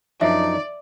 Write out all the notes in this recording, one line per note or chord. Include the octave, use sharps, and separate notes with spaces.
F#2 F3 D4 D#4 D5 E5